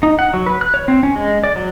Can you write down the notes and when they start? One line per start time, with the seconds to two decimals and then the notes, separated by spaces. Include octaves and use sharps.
0.03 D#4
0.19 F#5
0.34 F#3
0.46 B4
0.61 F#6
0.74 C#5
0.88 C4
1.03 C#4
1.16 G#3
1.44 D5
1.56 F#3